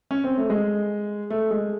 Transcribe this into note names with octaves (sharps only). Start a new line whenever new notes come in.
C#4
C4
A3
G#3
A3
G#3